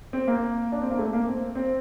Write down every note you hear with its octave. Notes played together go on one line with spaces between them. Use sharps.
C4
A#3
D4
C4
A#3
A3
A#3
C4
C4